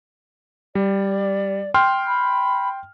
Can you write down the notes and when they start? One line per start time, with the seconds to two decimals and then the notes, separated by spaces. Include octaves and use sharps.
0.75 G3 D5
1.74 G5 C6 F6
2.07 B5